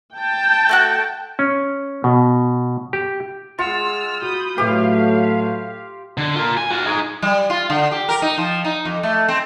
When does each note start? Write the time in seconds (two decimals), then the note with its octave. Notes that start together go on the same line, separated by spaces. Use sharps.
0.17 G5 A5
0.69 A3 F#4 F#6
1.39 C#4
2.04 B2
2.93 G4
3.59 G#3 F4 F#5 E6 F6 C#7
4.22 F#4 B5 D#6 G6
4.58 A2 F#3 A3 G4 B4 F5
6.18 D3
6.36 F4 A#4
6.57 G#5
6.71 F4 F#4
6.87 D#4 G#4
7.22 G3
7.50 F4
7.70 D3
7.91 G4
8.09 A#4
8.22 D#4
8.38 F3
8.65 D#4
8.85 F2
9.03 A3
9.28 C4